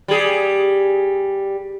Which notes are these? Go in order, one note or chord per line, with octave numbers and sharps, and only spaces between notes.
G3 G#4